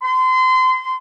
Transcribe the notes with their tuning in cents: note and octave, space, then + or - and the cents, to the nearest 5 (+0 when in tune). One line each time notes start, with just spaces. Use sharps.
C6 -30